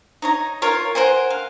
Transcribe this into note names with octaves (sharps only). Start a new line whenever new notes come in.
D#4 C#5 A#5
F4 A#4 C#5
A#4 C5 F#5 G#5
F5